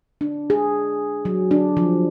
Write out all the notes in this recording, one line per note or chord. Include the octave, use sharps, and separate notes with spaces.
D4
G#4
F#3
D4
F3